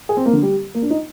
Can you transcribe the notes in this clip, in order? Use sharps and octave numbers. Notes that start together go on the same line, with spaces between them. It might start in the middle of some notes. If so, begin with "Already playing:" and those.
G#4
C4
A#3
D3
G3
A#3
D4
D#4